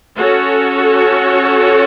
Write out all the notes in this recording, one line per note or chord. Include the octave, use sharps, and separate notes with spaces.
C#4 F#4 A4 C#5